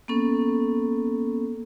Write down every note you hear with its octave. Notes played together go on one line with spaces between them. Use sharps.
A#3 B3 C#4 A4